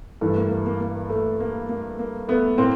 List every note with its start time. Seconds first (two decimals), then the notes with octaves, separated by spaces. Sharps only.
0.21 G2 E3 A3
0.36 A#3
0.50 A#3
0.66 A#3
0.80 A#3
1.10 A3
1.40 A#3
1.69 A#3
1.99 A#3
2.29 A3 B3
2.58 A2 A#3 C4